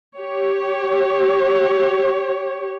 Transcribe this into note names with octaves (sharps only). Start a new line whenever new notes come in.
G4 C#5